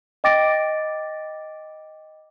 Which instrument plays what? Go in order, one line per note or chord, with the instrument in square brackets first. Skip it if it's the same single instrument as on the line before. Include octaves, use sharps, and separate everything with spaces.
[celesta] D#5 G5 D6 A6 A#6 D7